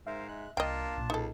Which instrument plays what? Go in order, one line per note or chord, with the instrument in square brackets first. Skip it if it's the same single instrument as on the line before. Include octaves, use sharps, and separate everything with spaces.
[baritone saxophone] G#2 [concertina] A#4 C5 F5 [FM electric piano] E5
[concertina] G#3 F#6
[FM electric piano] C2 [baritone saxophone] A#3 [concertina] D4 F4 A5 [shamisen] D#5 G5
[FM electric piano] B1 A#2
[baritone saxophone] C#2 [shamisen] D#4 A4